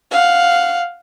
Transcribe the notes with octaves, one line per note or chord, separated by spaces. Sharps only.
F5 F#5